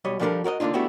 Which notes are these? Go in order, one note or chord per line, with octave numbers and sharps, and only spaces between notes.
B1 G3 C#5 D#5
F3 G3 D4 E4 A4 A#4
F#4 A#4 D5 D#5
D3 A#3 D4 D#4 F4
A3 B3 D4 E4 F#4 G4